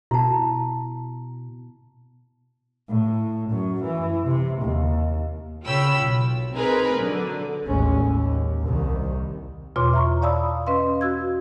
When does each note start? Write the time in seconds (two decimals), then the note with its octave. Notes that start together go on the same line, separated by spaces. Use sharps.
0.11 B2 E4 A5
2.88 A2
3.50 F#2
3.84 E3
4.27 C3
4.62 D#2
5.65 C#3 F4 C#5 G5 B5 E6
6.02 B1
6.54 C4 D#4 G#4 A#4 B4
6.98 D3 F#3
7.66 A1 D#2 G#3 C#4
8.01 D#2
8.65 C2 D#3
9.76 E2 B2 F4 C#5 C6 D6
9.93 E5 A#5 C#6
10.22 D5 F5 A5 B5 D#6 E6
10.67 C#4 B4 D#5 F5 C6
11.01 F#4 E6 G#6